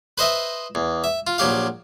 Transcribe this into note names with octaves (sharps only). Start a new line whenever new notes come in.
B4 C5 D#5 E5
E2
E5
F4
A#1 F#3 G4 F5